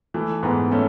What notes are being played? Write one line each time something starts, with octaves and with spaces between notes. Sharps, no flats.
E3 A3
G#2 B3
A3 C#4